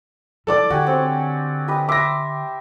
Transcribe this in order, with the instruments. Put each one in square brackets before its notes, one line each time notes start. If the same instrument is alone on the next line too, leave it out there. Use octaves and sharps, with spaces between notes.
[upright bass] E3 [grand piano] A4 D5 D6
[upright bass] D3 [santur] F#4 G4 G#5
[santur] C4 C#5
G4 B4 D#5
[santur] E5 C6 [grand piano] D6 A#6